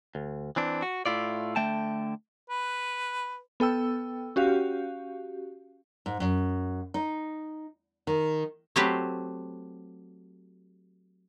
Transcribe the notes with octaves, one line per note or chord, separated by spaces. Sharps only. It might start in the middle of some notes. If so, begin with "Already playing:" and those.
D2
E3 C4 D4
F#4
A2 A3 E4 F4 D5
D3 A3 G5 A5
B4
B3 A4 G5 E6
C#4 F#4 G4 F5
G#2
F#2
D#4
D#3
F#3 A3 C4 G4 B4 C5